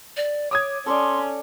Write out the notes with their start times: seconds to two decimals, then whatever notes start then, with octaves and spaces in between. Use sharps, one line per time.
0.17 D5
0.51 C#5 D6 D#6 G#6
0.86 C#4 A4 D5 C6